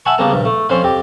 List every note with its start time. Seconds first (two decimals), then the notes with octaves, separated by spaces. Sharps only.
0.05 E5 F#5 G#5 A5 B5 C#6
0.18 C#3 G3 A#3 B3 A5 A#5
0.31 A#1 G2
0.45 A3
0.69 F2 C#4 C5 F5 B5
0.83 F2 G4